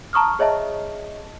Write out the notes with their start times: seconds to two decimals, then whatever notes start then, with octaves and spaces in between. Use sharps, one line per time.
0.13 A5 A#5 C#6 D#6 F6
0.39 G#4 C#5 D#5 E5 A5